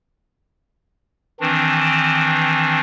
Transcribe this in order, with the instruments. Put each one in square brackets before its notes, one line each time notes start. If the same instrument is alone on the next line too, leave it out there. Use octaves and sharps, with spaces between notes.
[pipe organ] D#3 E3 C4 D4